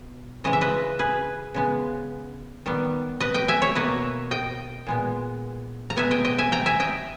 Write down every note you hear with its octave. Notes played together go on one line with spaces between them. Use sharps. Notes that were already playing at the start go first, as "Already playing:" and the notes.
Already playing: B2
C#3 E3 G#3 D#5
E5
B4 D#5
G#4 B4
C#3 G#3 B3
D#3 G3 B3
B4 D#5
D#5 G5
E5 G#5
C#5 E5
B2 A#3 B4 D#5
D#5 G5
A#2 G#3 B3
A#5
B2 G#3 B3 E5 G#5
D#5 G5
D#5 G5
E5 G#5
G5 A#5
E5 G#5
D#5 G5